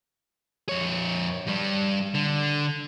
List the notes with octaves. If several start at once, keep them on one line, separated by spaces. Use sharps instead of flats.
F2 C#5
G2 G3
D3